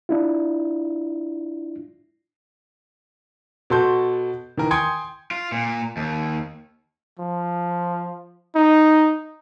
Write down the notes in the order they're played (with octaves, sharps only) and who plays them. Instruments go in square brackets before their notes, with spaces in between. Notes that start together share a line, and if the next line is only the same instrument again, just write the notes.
[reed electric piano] D4 E4 F4
[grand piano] B2 F#4 A4 C6 G6
D#3 E3 A#4
G5 G#5 C6 D#6 G#6 C#7
[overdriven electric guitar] F4
A#2
D#2
[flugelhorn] F3
D#4